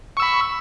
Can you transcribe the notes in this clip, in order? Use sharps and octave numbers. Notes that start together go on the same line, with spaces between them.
B5 C#6 E6